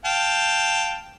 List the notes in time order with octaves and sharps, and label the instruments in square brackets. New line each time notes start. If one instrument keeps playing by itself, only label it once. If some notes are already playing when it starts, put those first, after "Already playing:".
[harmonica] F5 G5 A5